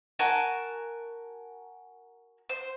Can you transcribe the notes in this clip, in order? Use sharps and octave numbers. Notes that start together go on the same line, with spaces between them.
F#4 A#4 G#5 A5
C5